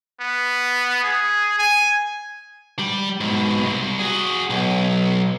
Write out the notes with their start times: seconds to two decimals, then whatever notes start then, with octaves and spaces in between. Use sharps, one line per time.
0.21 B3
1.03 G#4
1.59 G#5
2.79 G3
3.20 G#2 B2
3.62 C2
3.99 F#4 G#4
4.50 B1